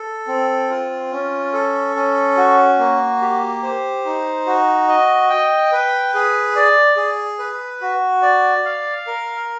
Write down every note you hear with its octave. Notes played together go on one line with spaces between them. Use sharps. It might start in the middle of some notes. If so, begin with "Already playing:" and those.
Already playing: A4
C4
F4
C#4
A4
C#4
F#4
A#3
G4
C5
D#4
F#4
D#5
G5
B4
G#4
D5
G#4
B4
F#4
D5
F5
A#4